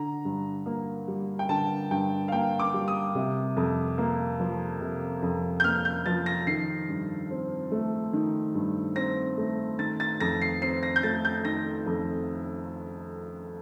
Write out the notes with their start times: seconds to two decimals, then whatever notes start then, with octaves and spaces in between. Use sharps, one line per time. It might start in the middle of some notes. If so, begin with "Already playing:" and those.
Already playing: D3 A#5
0.25 G2
0.66 A#3
1.08 G3
1.39 G5
1.49 D3 A5
1.91 G2 G5
2.28 F5
2.32 A#3 G5
2.59 D6
2.74 G3
2.88 D#6
3.15 C3
3.57 F2
3.98 A#3
4.40 F3
4.81 C3
5.23 F2
5.60 G6
5.64 A#3 F6
5.85 G6
6.06 F3 A6
6.26 A#6
6.47 D#3 C7
6.89 G2
7.31 C4
7.72 A3
8.13 D#3
8.54 G2
8.96 C4 A#6
9.37 A3
9.79 D#3 A6
10.00 A6
10.20 F2 A#6
10.41 C7
10.62 C4 C7
10.83 A#6
10.96 G6
11.03 A3 A6
11.25 G6
11.45 D#3 A#6
11.86 F2